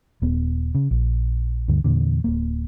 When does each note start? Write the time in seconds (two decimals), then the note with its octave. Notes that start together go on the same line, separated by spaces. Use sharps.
0.22 D#1 B3
0.75 C#3
0.91 A#1
1.68 D2 G2 D3
1.84 E2 A#2 D3
2.24 D1 A#3